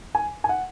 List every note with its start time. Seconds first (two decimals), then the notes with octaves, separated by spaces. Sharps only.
0.15 G#5
0.44 G#5
0.49 F#5